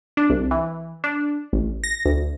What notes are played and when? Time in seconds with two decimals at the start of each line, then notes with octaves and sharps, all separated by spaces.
0.17 D4
0.30 C2
0.51 E3
1.04 D4
1.53 A1
1.84 A#6
2.05 D2